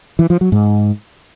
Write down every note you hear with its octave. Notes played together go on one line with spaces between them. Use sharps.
E3
F3
F#3
G#2